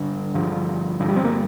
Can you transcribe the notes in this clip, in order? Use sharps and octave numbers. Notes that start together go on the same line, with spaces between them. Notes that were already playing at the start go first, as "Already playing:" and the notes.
Already playing: G2 D3
G2 D3 F3
G2 D3 F3
G3
C4
A#3